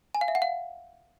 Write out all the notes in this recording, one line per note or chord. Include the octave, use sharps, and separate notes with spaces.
G#5
F5
E5
F#5
F5